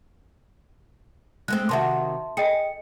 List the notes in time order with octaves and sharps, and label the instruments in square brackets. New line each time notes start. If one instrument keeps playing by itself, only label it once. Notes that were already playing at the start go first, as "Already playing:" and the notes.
[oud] G#3 A3 C4 [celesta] F#6
[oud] C3 D#3 F#4 [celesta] E5 A5 C6
[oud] G#4 [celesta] D#5 G5 C#7